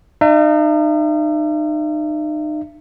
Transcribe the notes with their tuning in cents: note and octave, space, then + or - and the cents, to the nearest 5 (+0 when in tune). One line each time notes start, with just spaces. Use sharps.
D#4 -35 E5 +40